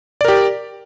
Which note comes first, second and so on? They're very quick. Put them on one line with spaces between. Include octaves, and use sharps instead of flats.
D5 A#4 G4